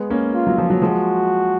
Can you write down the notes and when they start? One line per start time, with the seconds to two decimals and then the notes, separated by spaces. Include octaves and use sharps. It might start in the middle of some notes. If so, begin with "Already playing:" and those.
Already playing: G#3 B3
0.10 A#3 C#4
0.34 F4
0.47 F#3
0.58 F3
0.70 F#3
0.82 F3 G#3 F#4